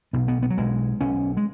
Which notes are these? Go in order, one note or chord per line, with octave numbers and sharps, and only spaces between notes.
B1 B2 B3
B3
B3
F#3
B1 B2 G#3
B1 B2 C#4
G#3